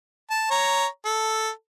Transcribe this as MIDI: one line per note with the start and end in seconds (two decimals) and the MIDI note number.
0.30 0.47 81
0.51 0.86 73
0.51 0.86 82
1.05 1.50 69